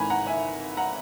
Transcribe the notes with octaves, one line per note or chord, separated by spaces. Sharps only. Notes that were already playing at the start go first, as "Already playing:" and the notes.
Already playing: G#1 G#2 E3 G#5 A#5 B5
F#5 A#5
E5 G#5
F#5 A#5